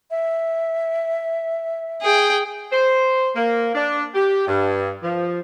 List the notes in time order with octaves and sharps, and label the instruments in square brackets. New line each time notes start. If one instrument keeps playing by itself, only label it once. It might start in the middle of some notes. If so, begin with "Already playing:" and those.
[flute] E5
[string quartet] G#4 G5
[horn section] C5
A#3
D4
G4
G2
F3